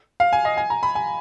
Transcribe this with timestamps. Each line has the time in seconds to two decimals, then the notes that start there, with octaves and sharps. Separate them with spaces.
0.20 F5
0.33 G#5
0.45 D#5
0.57 G#5
0.70 A#5
0.83 B5
0.95 G#5